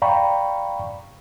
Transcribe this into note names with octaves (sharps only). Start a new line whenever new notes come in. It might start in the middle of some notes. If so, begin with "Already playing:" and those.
D5 F5 G5 A#5 B5 C#6